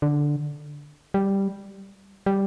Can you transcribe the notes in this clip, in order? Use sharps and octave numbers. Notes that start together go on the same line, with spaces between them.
D3
G3
G3